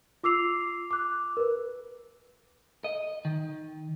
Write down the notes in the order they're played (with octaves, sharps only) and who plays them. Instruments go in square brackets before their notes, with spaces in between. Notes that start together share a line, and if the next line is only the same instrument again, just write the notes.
[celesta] F4 D6 E6 C7 F7
D6 F#6
A#4 B4
[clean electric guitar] D#5
D#3